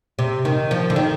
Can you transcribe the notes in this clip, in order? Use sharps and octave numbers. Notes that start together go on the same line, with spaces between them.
C3
D#3
F3
D3
D#3